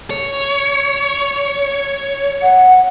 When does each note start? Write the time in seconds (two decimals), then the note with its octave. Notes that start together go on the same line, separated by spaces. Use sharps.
0.10 C#5
2.43 F#5